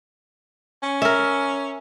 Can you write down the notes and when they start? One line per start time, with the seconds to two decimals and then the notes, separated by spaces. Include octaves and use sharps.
0.83 C#4
1.02 A#4 E5